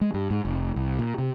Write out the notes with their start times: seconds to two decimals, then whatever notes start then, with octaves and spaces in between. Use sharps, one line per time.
0.01 G#3
0.14 G2
0.30 G#2
0.45 F1
0.76 C2
0.99 A#2
1.18 C3